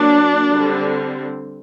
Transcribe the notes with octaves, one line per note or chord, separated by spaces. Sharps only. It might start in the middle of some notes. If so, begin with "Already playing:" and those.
Already playing: F#3 A#3 D4
D3 G3 C4